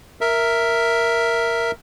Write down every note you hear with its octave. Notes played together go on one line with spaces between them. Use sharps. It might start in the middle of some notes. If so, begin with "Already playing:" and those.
A#4 E5